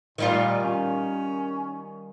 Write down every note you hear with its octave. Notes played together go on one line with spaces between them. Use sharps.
A#2 D#3 G3 F4
C#4